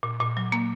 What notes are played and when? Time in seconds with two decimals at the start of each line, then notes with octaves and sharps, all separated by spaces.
0.03 A#2
0.20 A#2
0.37 F#3
0.52 A#3